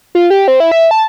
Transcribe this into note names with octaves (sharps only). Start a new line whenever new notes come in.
F4
G4
C4
E4
E5
A5